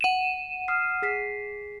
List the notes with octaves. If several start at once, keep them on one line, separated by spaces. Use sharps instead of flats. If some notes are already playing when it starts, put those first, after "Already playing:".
F#5 D#7 E7
D#6 F6 C7
G#4 B6 C7